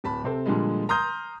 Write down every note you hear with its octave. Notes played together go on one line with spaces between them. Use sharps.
D1 A5 B5
C3 C4 A4
A#2 D3 F3 G3 G#3
A#5 C6 D#6 F6 G6